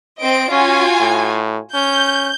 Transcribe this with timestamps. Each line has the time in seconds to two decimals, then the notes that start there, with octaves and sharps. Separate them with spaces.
0.23 C4 D#5 D7
0.51 C#4 F4 F#4 G#5
1.01 A2
1.74 C#4 G6